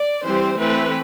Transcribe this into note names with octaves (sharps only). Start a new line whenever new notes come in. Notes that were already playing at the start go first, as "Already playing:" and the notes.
Already playing: D5
E3 G3 C4 C5
E3 A3 C4 B4